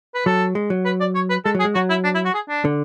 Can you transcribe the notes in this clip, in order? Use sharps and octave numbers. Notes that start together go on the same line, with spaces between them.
B4
F#3 A4
G#3
F#3
B4
D5
C#5
B4
G#3 A4
F#3
G#4
G#3
F#3 F#4
E4
D4
E4
F#4
G#4
D4
D3